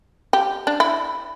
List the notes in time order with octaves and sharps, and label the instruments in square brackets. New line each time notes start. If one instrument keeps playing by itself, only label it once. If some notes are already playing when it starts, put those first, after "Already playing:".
[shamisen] G4
D4
E4